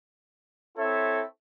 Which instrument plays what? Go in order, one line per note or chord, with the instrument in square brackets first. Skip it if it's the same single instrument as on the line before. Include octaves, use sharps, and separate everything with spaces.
[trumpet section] C4 E4 A4 C#5 E5